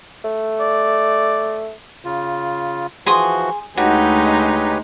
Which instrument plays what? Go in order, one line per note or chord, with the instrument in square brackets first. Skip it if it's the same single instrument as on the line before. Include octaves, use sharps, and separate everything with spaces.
[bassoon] A3
[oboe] D5
[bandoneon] C#3 F4
[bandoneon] E3 F3 F#4 [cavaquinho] G#4 C6 D#6
[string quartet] D2 G#3 D#4 [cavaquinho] F#4 [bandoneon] G4 B4 C#5